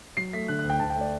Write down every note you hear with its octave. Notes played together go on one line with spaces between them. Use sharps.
F#3 C7
A3 B6
D3 F#6
F#6
D2
G5
D2 A5
G5
A3
D5